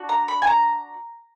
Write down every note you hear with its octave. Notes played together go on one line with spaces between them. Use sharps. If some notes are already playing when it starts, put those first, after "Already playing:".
Already playing: D4 F#4
A#5
B5
G#5
A#5